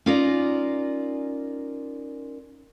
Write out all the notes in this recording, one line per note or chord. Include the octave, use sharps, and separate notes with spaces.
C#4 D#4 F4 A#4 D5 A#5